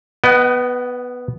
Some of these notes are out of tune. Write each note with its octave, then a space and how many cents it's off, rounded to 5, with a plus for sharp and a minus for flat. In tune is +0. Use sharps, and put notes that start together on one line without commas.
B3 +0 D#5 +0 F#5 +40